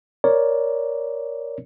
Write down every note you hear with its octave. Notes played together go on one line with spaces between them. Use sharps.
A#4 C#5 D5